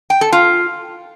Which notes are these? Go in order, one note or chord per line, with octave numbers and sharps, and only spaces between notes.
G5
A4
F4